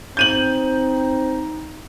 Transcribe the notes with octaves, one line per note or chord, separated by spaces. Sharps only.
C4 D#4 G6 D#7 F#7